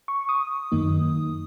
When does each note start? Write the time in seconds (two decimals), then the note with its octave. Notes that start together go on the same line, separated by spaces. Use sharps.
0.08 C#6
0.29 D#6
0.72 F#2 D#3 A#3 D#4